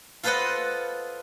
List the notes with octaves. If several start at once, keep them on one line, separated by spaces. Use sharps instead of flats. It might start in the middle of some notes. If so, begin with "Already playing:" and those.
F4 A4 B4 C5 D#5 F#5